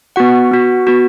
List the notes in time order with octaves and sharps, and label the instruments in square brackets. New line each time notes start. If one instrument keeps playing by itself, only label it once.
[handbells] B3 F#4 F#5
B3 F#4
B3 F#4